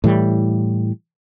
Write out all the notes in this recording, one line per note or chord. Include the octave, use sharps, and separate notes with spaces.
A2 E3 G3